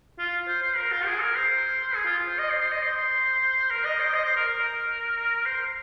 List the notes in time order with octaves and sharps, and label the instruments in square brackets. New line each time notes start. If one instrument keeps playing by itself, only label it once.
[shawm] F4
C5
C5
A#4
F4
G#4
A#4
C5
G#4
F4
C5
D#5
C5
C5
D#5
C5
A#4
D#5
C5
D#5
C5
A#4
A#4
A#4
C5